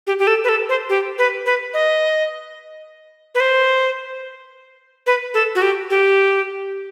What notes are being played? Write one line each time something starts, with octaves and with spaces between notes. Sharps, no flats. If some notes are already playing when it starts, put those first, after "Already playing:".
G4
G4
A4
B4
A4
C5
G4
B4
B4
D#5
B4
C5
B4
A4
F#4
G4
G4